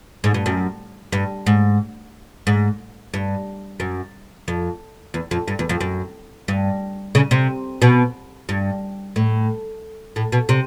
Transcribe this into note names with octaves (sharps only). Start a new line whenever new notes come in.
G#2
G2
F#2
G2
G#2
G#2
G2
F#2
F2
E2
F2
G2
E2
F2
F#2
G2
C#3
C3
B2
G2
A2
A2
B2
C3